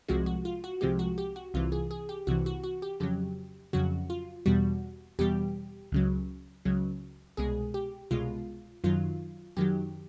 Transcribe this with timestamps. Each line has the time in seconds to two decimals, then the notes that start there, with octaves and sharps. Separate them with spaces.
0.08 C2 C3 F3 G#3 F#4
0.26 F#4
0.45 F4
0.64 F#4
0.81 C2 C3 F3 G#3 G4
0.99 F#4
1.18 G4
1.36 F#4
1.54 C2 C3 E3 F4
1.72 G#4
1.91 G#4
2.09 G4
2.27 C2 C3 E3 F#4
2.46 F#4
2.64 F#4
2.82 G4
3.00 F2 C#3 F#3 G4
3.73 F2 C#3 F#3 F#4
4.10 F4
4.46 E2 B2 G3 F#4
5.19 E2 B2 G3 G4
5.92 C#2 C#3 F#3
6.65 C#2 C#3 F#3
7.37 C2 B2 G#3 G#4
7.74 G4
8.11 C2 B2 G#3 F4
8.84 F#2 D#3 F#3 F4
9.57 F#2 D#3 F#3 G4